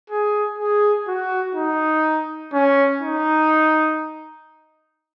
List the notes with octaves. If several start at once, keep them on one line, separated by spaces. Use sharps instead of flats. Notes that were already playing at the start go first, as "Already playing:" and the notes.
G#4
G#4
F#4
D#4
C#4
D#4